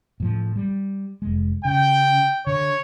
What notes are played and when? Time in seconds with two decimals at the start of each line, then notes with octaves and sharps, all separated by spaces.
0.20 A2 F3
0.56 G3
1.22 F1 G#3
1.65 C#3 G5
2.47 D3 C#5